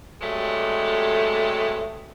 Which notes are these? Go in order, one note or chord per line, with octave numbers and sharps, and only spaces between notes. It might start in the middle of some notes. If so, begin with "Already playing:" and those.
G2 C3 F#3 G#3 A3